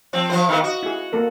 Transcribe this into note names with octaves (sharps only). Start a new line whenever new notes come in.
F3 C4
F3 F4 C5
D#3 B3 A#4 F5
F#4 D#5
E4 G#4
A#3 A4 A#4